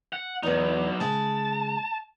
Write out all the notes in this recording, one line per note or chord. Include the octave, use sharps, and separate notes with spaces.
F#5
E2 F#3 B3 D#4
C#3 G#3 A5